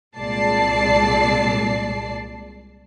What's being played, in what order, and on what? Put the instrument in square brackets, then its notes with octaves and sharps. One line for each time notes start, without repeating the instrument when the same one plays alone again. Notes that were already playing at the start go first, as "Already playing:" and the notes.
[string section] C2 A#2 G#3 D5 A5 C7